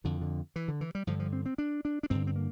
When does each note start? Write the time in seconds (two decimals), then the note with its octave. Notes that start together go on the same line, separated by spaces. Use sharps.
0.04 F2 D3 E3
0.22 D3
0.56 E3
0.68 D3
0.81 E3
0.95 G3
1.07 G2 D3 F3
1.20 F3
1.33 C4
1.46 C4
1.58 D4
1.85 D4
2.03 D4
2.10 G2 D3 C4
2.27 C4
2.36 A#3